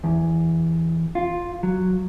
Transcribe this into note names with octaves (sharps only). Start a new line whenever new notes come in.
E2
F4
F#3